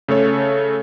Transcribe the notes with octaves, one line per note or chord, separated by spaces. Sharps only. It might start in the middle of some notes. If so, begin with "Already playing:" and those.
C#3 A3 A4 C#5